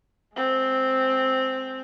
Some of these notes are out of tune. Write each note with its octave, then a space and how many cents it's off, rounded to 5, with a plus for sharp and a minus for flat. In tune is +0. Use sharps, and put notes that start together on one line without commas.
G#3 +20 C4 +0